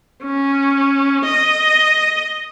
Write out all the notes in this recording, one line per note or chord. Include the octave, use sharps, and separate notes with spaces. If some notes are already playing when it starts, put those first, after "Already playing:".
C#4
D#5